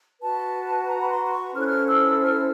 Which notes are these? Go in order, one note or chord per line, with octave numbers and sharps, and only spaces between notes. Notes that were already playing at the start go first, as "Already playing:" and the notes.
F#4 B4 A5
A#5
B5
C6
C6
C#6
C#4 E4 A4 C5 F6
F#6
F6
E6
F6